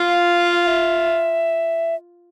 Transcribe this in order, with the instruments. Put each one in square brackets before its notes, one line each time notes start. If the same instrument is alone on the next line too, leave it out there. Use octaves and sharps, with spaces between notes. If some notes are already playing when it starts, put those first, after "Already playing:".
Already playing: [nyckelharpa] F4 [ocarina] F5
[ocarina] F5
E5